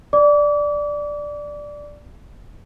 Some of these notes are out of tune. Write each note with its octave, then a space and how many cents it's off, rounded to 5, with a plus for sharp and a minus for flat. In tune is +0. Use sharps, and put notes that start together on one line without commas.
D5 +0 D6 -35